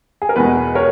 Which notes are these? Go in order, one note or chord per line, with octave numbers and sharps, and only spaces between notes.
G#4
A#4
E2 B2 G#3 G#4 B4
A#4 C#5